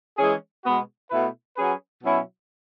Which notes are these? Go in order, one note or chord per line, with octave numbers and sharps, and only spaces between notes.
E3 G#3 C#4 G#4
B2 G#3 B3 F#4
B2 A3 E4 B4
F#3 C#4 G#4 B4
B2 F#3 C#4 E4